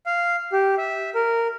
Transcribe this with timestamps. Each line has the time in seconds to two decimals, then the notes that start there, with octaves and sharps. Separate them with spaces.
0.06 F5
0.52 G4
0.78 E5
1.15 A#4